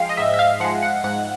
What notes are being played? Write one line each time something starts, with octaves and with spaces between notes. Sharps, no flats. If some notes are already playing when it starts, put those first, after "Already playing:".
Already playing: F3 G#3 F5 G5
D#5
G#2 E5
E5
F5
F3 G#3 F#5
F#5
G#2 F#5